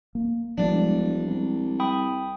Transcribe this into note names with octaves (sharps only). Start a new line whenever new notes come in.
A#3
E1 F3 G3 G#3 D4
C2
G5 B5 D#6